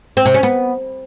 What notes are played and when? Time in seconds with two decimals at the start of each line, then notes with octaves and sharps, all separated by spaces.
0.17 C4
0.26 C3
0.34 C#4
0.43 B3